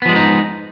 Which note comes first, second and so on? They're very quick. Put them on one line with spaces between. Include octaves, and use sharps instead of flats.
B3 F3 G#3 G3 D#4